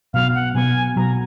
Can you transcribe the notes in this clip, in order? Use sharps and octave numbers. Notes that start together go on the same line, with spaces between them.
B2 F#3 B3 F5
F#5
B2 F#3 B3 G#5
B2 F#3 B3 A#5